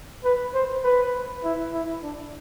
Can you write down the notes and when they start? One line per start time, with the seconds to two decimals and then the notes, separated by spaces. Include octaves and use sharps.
0.24 B4
0.54 C5
0.84 B4
1.44 E4
1.73 E4
2.03 D4